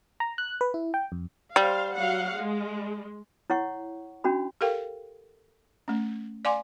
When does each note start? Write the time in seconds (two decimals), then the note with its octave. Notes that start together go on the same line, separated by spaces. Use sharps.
0.20 A#5
0.38 F#6
0.61 B4
0.74 E4
0.94 G5
1.12 F2
1.56 G3 C5 F5
1.94 F#3 F5 F#5
2.36 G#3
3.50 E4 C#5 F#5 C#6
4.24 C#4 D4 F#4 B5
4.61 G4 A4 A#4 F5 G5
5.88 A3 C#4
6.45 D5 F5 G#5 C6 D6